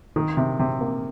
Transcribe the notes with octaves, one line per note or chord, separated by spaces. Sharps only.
D#3
C3
C3
A#3